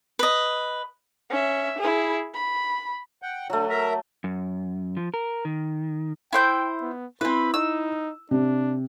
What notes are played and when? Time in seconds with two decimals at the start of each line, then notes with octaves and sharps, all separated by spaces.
0.19 B4 D#5
1.31 C#4 E5
1.79 E4 G#4
2.35 B5
3.22 F#5 G5
3.50 D3 F#3 A3
3.70 A#4 E5 A#5
4.24 F#2
4.97 F3
5.14 A#4
5.45 D#3
6.33 E4 C5 G5 G6
6.82 B3
7.21 C4 E4 B4 B5
7.54 D#4 E6
8.31 C3 D4